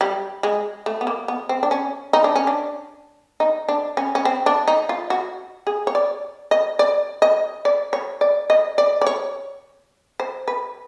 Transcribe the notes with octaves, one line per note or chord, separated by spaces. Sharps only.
G3
G#3
A3
B3
A#3
B3
C4
D4
C#4
D#4
D4
C#4
D4
D#4
D4
C#4
C#4
C4
D4
D#4
F4
F#4
G#4
C#5
D5
D#5
D5
D#5
D5
C#5
D5
D#5
D5
D5
C#5
C5
B4